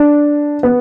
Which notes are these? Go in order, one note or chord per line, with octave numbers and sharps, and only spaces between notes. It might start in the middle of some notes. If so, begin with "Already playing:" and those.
Already playing: D4
B3